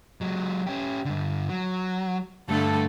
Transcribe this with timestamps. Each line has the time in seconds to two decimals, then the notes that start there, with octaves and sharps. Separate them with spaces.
0.21 F#3 G#3
0.67 C#4 G4
1.05 G2 D3
1.49 F#3
2.49 G2 D3 A3 A4